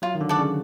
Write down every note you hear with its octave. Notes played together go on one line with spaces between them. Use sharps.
F#3 F4
D#3
D3
A4 D5 F#5
C#3